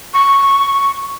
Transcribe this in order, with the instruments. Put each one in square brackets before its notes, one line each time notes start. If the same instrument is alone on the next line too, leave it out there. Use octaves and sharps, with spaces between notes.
[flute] C#6